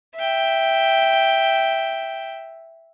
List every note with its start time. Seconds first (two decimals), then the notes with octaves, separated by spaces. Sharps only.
0.16 E5 G5